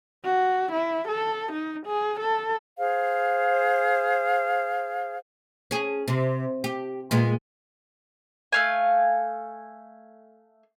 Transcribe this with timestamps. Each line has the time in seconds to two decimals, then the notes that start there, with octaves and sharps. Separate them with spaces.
0.25 F#4
0.72 E4
1.09 A4
1.52 D#4
1.86 G#4
2.20 A4
2.77 G#4 C5 F5
5.71 C#4 G#4
6.08 C3
6.64 G4
7.11 A#2 G#3 B3
8.52 A3 F5 G#5